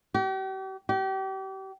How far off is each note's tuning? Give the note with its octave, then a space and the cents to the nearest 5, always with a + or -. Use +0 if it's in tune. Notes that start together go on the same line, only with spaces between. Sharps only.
G4 -40
G4 -35